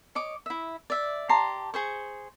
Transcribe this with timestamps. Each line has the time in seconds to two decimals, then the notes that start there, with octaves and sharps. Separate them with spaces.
0.15 C#5 D#5 D6
0.46 E4 E5
0.90 D5 E5
1.29 G4 A5 A#5 C6
1.74 G#4 C5 C#6